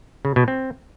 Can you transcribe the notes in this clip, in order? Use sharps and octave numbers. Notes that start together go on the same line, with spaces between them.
C#3
B2
C4